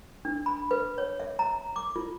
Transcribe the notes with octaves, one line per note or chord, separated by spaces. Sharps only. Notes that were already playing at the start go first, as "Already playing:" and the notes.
D4
B5
B4
C#5
E5
A#5
D6
F4